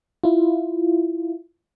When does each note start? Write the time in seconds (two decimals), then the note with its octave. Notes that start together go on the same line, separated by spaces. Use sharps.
0.24 E4 F4